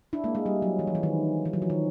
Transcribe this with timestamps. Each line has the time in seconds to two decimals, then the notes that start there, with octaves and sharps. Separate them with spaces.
0.13 D4 E4
0.24 G#3 A#3
0.35 G#3
0.46 G3
0.62 F#3
0.79 E3
0.87 F3
0.95 E3
1.03 D#3
1.45 E3
1.53 F#3
1.62 F3
1.70 D#3